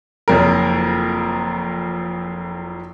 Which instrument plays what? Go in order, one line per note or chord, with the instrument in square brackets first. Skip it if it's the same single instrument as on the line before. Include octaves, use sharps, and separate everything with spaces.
[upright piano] F#1 F2 A#4